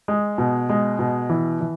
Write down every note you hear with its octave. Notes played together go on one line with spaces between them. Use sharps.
G#3
B2
G#3
B2
E3
E3